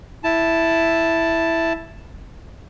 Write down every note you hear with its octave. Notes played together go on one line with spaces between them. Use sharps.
E4 A5